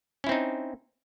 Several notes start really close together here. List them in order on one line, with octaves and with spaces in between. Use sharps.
C#4 E4 C4 D#4